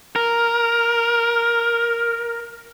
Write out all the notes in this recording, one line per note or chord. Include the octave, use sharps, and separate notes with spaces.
A#4